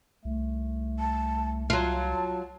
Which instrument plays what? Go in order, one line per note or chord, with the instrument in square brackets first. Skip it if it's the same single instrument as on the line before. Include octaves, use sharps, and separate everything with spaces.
[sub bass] C2 [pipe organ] A3
[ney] A5
[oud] F#3 F4 [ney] A5